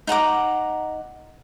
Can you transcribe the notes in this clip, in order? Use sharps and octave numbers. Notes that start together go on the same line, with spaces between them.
D#4 F#5 A#5 D6